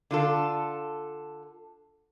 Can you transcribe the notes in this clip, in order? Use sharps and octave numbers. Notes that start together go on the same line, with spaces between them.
D3 F4 A4